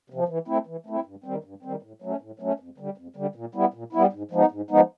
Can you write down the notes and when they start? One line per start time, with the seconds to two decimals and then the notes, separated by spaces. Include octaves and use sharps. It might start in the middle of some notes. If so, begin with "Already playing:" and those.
0.10 C3 F3
0.29 E3
0.48 A3 C4 E4
0.67 E3
0.86 A3 C4 E4
1.05 G2
1.24 D#3 G3 C4
1.44 G2
1.63 D#3 G3 C4
1.83 A2
2.02 F#3 A3 C#4
2.21 A2
2.40 F#3 A3 C#4
2.60 F2
2.78 D3 G3
2.97 F2
3.16 D3 G3
3.35 A#2
3.55 G3 B3 E4
3.74 A#2
3.93 G3 B3 E4
4.13 G#2
4.31 F3 G#3 B3 D#4
4.51 G#2
4.70 F3 G#3 B3 D#4